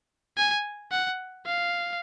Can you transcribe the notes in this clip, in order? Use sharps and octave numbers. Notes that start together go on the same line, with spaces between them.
G#5
F#5
F5